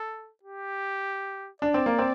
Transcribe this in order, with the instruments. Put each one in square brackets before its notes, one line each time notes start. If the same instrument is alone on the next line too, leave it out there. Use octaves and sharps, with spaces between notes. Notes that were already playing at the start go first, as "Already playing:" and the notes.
Already playing: [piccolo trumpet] A4
G4
[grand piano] D4 [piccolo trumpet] D5
[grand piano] C4
A#3
C4